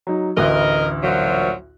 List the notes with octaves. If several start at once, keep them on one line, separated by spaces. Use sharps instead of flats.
F#3 D#4
A1 D2 A#4 D#5 F#6
A#2 F3 F#3